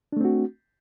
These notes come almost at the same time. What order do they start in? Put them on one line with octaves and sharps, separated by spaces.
D4 A3 C4 F#4